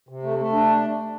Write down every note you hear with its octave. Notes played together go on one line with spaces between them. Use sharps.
C3
A3
A3
D4